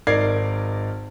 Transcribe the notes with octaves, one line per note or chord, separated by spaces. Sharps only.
G#1 D#4 A#4 D5 G#6 C7